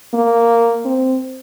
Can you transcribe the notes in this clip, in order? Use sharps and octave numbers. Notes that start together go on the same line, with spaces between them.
A#3
C4